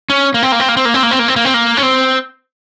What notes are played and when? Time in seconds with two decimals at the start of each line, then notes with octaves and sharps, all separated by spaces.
0.10 C#4
0.34 A#3
0.43 C4
0.52 A#3
0.60 C4
0.69 A#3
0.77 C4
0.85 A#3
0.94 C4
1.03 A#3
1.11 C4
1.19 A#3
1.28 C4
1.36 A#3
1.45 C4
1.54 A#3
1.77 C#4
1.83 C4